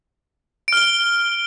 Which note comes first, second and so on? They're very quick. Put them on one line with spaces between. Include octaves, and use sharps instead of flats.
D7 F6 G7